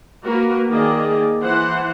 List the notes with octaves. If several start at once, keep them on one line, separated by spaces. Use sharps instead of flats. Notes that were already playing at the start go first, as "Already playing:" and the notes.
A#3 F#4 A#4 B4
D#3 A#3 G#4 D5 D#5
E3 C5 F#5